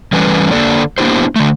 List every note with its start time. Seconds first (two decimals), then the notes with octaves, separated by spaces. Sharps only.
0.13 E3 G3 A3 C#4 B4
0.51 D3 A#3 A4 D5
0.98 A#3 B3 D4 E4 G4 C5
1.36 D3 A3